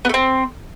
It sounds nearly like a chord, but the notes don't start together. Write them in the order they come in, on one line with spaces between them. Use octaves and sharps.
B3 A3 C4